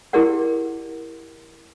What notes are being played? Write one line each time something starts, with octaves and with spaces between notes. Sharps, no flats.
E4 G4 G#4 A#4 D5 F#5